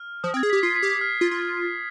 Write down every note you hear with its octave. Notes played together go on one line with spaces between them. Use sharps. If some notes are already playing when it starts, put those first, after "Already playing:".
Already playing: F6
F3 D#6
C4
G#6
G#4
G4 B6
F4 C7
B6
G4
G#6
F6
F4
F4